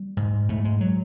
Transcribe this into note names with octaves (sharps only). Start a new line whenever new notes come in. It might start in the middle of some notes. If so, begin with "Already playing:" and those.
Already playing: G3
G#2
G#2 A3
G#3
F#3